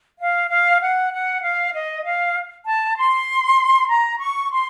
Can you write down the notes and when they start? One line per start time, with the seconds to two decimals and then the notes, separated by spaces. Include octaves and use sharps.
0.19 F5
0.49 F5
0.80 F#5
1.12 F#5
1.42 F5
1.73 D#5
2.03 F5
2.65 A5
2.96 C6
3.88 A#5
4.19 C#6
4.50 C6